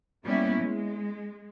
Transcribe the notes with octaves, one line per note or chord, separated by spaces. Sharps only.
G3 A#3 B3 C#4 E4
G#3